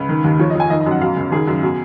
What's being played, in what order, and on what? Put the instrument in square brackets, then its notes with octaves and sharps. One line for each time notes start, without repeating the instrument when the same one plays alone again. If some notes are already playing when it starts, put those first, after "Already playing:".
Already playing: [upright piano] C#2 B4
D#3
D#2
F3 C#5
D#5
F2 G#5
D#3 D#5
D#5
F#2 F#5
B2 F5
C#2
D#3 G#4
F#2
B2